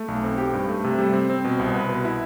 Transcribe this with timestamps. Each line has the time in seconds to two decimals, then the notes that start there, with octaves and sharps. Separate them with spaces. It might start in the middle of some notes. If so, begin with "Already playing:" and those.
Already playing: A3
0.08 B1
0.23 C4
0.38 G4
0.53 G2
0.69 A3
0.84 C3
0.99 G3
1.13 C4
1.29 C4
1.44 B2
1.59 C2
1.74 B4
1.89 B2
2.05 E4